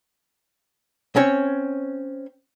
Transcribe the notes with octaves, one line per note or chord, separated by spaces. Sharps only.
C4 C#4 C#5